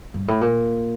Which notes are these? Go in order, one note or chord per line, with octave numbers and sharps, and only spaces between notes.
G2
A2
A#2